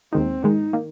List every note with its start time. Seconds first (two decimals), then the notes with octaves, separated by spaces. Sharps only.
0.13 D#2 D#3 G#3 C4 D#4
0.43 G#2 D#3 G#3 D#4
0.73 D#3 A#3